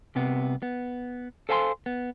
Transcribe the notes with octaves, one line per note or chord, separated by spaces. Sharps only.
C2 C3 B3
B3
A4 C5 F5 G#5 A5 C6
B3